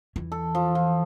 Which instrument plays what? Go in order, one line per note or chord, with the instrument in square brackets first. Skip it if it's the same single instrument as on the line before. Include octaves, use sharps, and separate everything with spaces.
[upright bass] E2 E3
[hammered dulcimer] A4
F3
F3